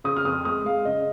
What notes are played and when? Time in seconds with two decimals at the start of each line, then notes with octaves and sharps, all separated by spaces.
0.04 C#3 D#6
0.16 F6
0.25 F2 D#6
0.45 G#3 D#6
0.65 G#3 F5
0.85 C#3 D#5